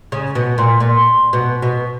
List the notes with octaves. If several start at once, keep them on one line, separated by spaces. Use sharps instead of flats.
C#3
B2
A#2
A#2
B2
B2